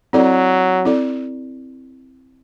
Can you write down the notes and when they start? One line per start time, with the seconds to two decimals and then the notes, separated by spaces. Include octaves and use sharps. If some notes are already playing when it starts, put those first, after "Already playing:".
0.13 F#3 C4 E4 A4 D5
0.85 C4 E4 A4 D5